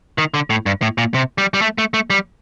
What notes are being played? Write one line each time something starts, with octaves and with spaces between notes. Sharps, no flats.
D#3
D3
A2
G2
A2
A#2
C3
G3
G3
A3
A3
A3
G3